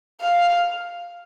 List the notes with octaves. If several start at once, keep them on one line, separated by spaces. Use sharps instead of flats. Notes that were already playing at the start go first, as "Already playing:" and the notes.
F5